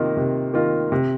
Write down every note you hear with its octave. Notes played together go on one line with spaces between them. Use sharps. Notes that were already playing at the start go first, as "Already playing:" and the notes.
Already playing: C3 D#3 A#3 F4
C3
D#3 A#3 F4
C3